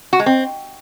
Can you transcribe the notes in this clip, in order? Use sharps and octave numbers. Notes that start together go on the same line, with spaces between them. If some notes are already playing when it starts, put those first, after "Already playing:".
F#4
G#3
C4